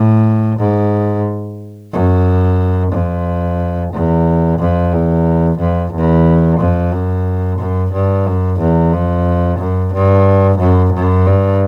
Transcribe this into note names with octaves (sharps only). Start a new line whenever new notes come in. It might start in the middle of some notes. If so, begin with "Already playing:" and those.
Already playing: A2
G#2
F#2
F2
E2
F2
E2
F2
E2
F2
F#2
F#2
G2
F#2
E2
F2
F#2
G2
F#2
F#2
G2